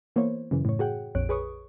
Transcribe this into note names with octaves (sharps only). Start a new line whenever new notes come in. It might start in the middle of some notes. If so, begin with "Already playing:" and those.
E3 A#3 B3 E4 C5 C#5
F#2 C#3 E3
A2 C#5
F#4 G#4 F#5 G5
A#1 F2 C#5 F#6 D7
G#4 B4 C#5 C#6 D#6